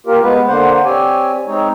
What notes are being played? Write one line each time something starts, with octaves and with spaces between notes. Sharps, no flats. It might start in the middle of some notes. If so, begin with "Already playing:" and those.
A#3 F4 G4 A#4
G#3 B3 B4
D3 A#3 C5 F#5
C4 G4 C#5 D5 G#5
G#3 C4 D#4 C#5